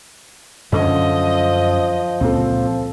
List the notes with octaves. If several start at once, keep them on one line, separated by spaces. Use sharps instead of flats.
F#2 D3 F3 F#3 C#4 D#5
C#2 A#2 C4 A4